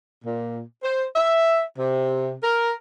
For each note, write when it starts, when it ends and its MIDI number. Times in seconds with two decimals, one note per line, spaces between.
0.25 0.60 46
0.83 1.04 72
1.16 1.62 76
1.78 2.32 48
2.43 2.74 70